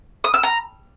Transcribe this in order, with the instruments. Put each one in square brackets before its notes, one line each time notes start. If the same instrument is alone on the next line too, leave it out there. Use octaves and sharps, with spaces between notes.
[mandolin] D#6
E6
A#5